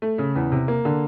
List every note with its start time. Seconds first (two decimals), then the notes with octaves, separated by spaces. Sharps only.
0.02 A3
0.18 C#3
0.35 E2
0.52 C3
0.68 A#3
0.85 D3